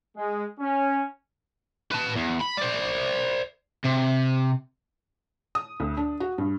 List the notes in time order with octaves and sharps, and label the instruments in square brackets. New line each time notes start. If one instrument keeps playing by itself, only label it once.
[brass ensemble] G#3
C#4
[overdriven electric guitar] B4 A5
E2
B5
C5 D5
C3
[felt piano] D#6
D2
D4
F#4
G2